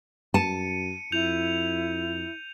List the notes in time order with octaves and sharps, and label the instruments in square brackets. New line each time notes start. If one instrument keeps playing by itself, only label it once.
[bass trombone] F#2 [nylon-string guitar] A5 [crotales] C#7 D#7
[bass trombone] F2 [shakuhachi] E4 [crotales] G6 F7